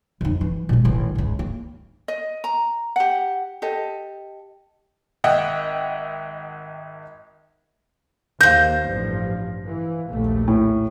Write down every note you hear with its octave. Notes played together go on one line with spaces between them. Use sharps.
F2 D#4
E3
A#2 G#3
A1 D#3
C#2 G#2
A#3
D#5
A#5
G4 F#5
G4 A4 D#5
G#1 D#5 E5 F#5 G5
D#2 D#3 C5 F5 G6 A#6
A1 G2 F3
E3
A#1 D#2 A3
A2